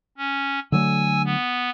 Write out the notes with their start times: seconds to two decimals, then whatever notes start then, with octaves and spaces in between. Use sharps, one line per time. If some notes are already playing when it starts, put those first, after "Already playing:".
0.17 C#4
0.72 D3 F#3 A3 G#5 E6
1.25 B3